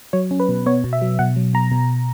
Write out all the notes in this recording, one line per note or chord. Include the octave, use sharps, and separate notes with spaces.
F#3 C#5
C#4
B4
B2
B3 C#5
B2
E5
F#3
B2 F#5
F#3
B2 A#5
B2